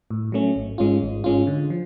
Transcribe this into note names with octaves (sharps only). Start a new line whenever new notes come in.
A2
F#3 A3 C#4
G#1
G#2 G#3 C#4 F4
G#1
G#2 G#3 C#4 F4
D3
F3